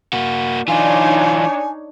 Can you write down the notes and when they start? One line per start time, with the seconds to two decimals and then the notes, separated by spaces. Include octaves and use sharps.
0.13 A#3 F#4
0.68 E3 D4 D#4 F4 C#5 G#5